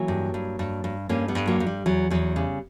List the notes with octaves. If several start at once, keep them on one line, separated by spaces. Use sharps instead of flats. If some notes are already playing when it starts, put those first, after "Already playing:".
Already playing: E3 F#3 A#3
G2
G2
G2
G2
G2 A#3 C#4
G3 B3
G2
F#3 A#3
G2
G3
E2 F#3
E2 F#3
C#3 G3